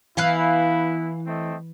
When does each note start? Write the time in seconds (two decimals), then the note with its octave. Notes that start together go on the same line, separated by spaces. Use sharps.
0.17 E3 B3 E4 B4 F5 G#5
1.27 A3 C4 D#5